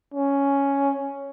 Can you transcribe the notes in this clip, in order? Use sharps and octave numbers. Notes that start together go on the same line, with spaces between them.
C#4